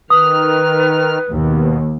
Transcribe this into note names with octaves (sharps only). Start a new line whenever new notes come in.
D#3 B4 D#6 F6
D#2 B2